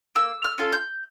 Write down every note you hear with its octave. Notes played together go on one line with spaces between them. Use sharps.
A#3 E6
F6
C#4 F4 A4
G6